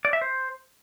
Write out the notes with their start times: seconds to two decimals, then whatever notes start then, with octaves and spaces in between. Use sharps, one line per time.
0.05 D5
0.13 E5
0.22 C5